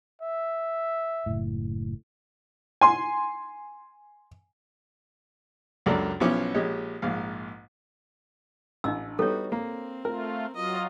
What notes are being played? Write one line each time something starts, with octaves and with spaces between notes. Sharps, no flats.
E5
F#1 A2
G#5 C6
C#2 F#2 A#3 D4 A4 D5
B1 F3 B3 C#4 E4 D6
A#1 G#3 G4 C#5 D#5
A#1 G#2 F5
A1 D4 D#5 E6
G3 B3 D#4 F#4 A4 C#5
A#3 C4
A3 F4 A#4
F#3 F4 D#5